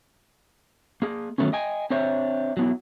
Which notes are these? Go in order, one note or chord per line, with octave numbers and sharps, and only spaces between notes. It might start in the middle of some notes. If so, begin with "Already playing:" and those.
A#3 G#4
D#3 E3 F#3 A3 B3 C#4
D#5 G5 G#5
C4 D4 C5 C#5 E5
F#3 B3 E4